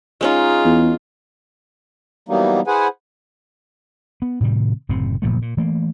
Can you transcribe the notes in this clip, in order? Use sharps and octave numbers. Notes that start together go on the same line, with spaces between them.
G#3 C#4 D#4 F4 G#4
E2
E3 F#3 G3 A#3 B3 D#4
E4 G#4 B4 C5 F#5 G#5
B3
A2 C3 D#3 G3
F#1 A2 C3 C4
F#1 A#2 F3 A3
A#2
E3 A3 A#3